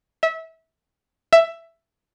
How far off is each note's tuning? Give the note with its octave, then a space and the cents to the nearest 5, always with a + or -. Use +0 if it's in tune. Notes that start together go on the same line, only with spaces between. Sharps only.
E5 -25
E5 +10